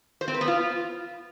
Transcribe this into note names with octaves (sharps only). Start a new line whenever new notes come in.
C5
C4
B4
B3
F4